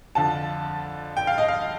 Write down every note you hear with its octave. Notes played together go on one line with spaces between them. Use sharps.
F2 D3 F3 A5
G5
F5
D#5
F5